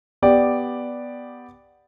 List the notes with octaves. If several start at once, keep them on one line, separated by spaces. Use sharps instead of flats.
B3 G4 D5